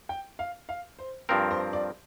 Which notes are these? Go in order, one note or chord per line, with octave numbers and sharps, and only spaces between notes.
G5
F5
F5
C5
G2 F3 C4 A#4
C5
D5